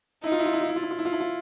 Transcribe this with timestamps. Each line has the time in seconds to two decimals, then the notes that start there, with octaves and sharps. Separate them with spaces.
0.24 D#4 E4
0.32 F4
0.39 E4
0.46 F4
0.53 E4
0.61 F4
0.69 E4
0.76 F4
0.83 E4
0.91 F4
0.99 E4
1.05 F4
1.13 E4
1.20 F4